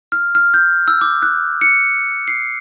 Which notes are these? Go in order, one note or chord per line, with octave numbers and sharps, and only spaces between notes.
F6
F6
G6
E6
D6
F#6
C#7
C7